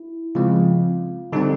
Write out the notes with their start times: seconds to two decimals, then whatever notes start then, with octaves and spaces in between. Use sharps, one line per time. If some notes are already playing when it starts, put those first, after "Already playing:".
Already playing: E4
0.35 C#3 F3 G#3 C4 F4
1.33 D3 G3 C4 D#4